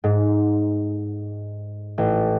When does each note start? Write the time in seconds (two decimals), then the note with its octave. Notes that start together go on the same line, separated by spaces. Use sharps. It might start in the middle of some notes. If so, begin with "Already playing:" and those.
0.04 G#2
1.98 A1